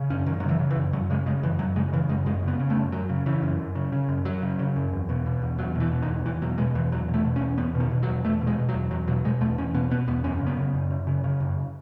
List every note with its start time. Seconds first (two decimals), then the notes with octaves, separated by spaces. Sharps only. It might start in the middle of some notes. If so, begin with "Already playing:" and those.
Already playing: C#3
0.10 F#2 C#4
0.26 F#2 D#3
0.40 F#3
0.44 C#3
0.49 E3
0.60 C#3
0.71 E3
0.76 F#2
0.93 F#2 F#3
1.10 C#3 G#3
1.26 C#3 G#3
1.43 F#2 E3
1.59 F#2 F#3
1.76 C#3 G#3
1.93 C#3 E3
2.09 F#2 G#3
2.26 F#2 G#3
2.42 C#3
2.48 B3
2.59 C#3
2.70 A3
2.77 F#2
2.92 F#2 F#3
3.09 C#3
3.26 C#3 E3
3.42 F#2
3.59 F#2
3.75 C#3
3.92 C#3
4.09 F#2
4.25 F#2 F#3
4.42 C#3
4.59 C#3
4.76 F#2
4.93 E2
5.09 B2
5.26 B2
5.42 E2
5.58 E2 F#3
5.75 B2
5.80 E3
5.91 B2
6.02 D#3
6.08 E2
6.25 E2 E3
6.42 B2 F#3
6.58 B2 G#3
6.75 E2 E3
6.92 E2 F#3
7.09 B2
7.14 A3
7.24 B2
7.36 C#4
7.41 E2
7.58 E2 B3
7.75 B2
7.80 D#3
7.91 B2
8.03 F#3
8.09 E2
8.24 E2 A3
8.41 B2
8.47 G#3
8.58 B2
8.69 F#3
8.74 E2
8.91 E2 F#3
9.07 B2 F#3
9.25 B2 G#3
9.41 E2 A3
9.58 E2 C#4
9.74 B2 B3
9.90 B2 B3
10.07 E2 B3
10.24 F#2 C#4
10.41 C#3
10.47 B3
10.57 C#3
10.74 F#2
10.90 F#2
11.07 C#3
11.24 C#3
11.40 F#2